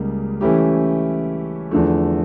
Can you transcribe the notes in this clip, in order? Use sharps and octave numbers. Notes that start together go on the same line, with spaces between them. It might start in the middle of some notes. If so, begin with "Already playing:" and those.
Already playing: C#2 C#3 G3 A#3
E3 A3 C#4 E4 G4
E2 D3 F3 A3